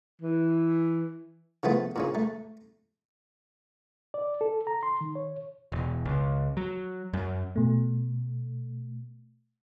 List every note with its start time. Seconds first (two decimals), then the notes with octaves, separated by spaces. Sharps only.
0.22 E3
1.63 C#3 F3 A3 B3
1.96 A#2 C#3 C#4
2.15 A3
4.14 D5
4.41 A4
4.67 A#5
4.83 C6
5.01 D#3
5.15 C#5
5.72 E1
6.05 C#2
6.57 F#3
7.13 F#2
7.56 B2 A3